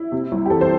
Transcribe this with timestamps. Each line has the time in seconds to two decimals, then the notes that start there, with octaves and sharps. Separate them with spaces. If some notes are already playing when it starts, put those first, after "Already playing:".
Already playing: E4
0.12 C3
0.32 C2
0.46 G4
0.50 E3 A4
0.61 C5